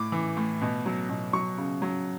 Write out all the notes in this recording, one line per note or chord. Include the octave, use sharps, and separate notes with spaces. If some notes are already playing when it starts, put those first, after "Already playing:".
Already playing: A2 D6
E3
A2
B2
F#3
B2
F#3 C#6
C#3
F#3